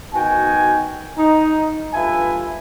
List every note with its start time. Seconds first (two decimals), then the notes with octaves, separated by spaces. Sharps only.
0.13 B2 D#3 F#4 G5 G#5
1.18 D#4
1.94 G2 F4 A4 B4 E5 G#5